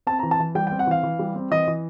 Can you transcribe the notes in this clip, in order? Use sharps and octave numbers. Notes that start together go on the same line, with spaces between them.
C4 A5
A#5
E3
A5
E3
G3 G5
G5
C4
F#5
E3 F5
E3
G3
C4
E3 D#5
E3